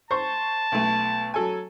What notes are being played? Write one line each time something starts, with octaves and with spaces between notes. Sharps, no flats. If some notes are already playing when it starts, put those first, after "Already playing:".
C5 A5 C#6
B1 A3
F#3 A4 G#5